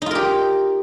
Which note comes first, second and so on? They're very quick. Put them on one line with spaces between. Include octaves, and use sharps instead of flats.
D#4 F4 A#4 G4